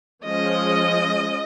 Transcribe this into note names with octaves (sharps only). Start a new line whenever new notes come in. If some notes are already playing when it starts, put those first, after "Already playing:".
F3 G#3 C#4 D#5